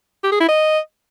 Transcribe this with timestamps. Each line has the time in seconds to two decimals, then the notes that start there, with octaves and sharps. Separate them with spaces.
0.24 G4
0.32 G#4
0.40 E4
0.48 D#5